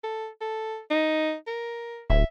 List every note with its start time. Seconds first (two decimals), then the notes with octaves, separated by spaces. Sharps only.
0.04 A4
0.41 A4
0.90 D#4
1.47 A#4
2.10 D1 E5